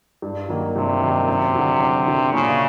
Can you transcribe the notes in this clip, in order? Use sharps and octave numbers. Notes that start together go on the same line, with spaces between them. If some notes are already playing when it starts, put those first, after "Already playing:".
G2
D#3 F#3 A#3
G2 C3
D#3 F#3 A#3
F#2
D3 F#3
F#2
D3 F#3
A#2 C#3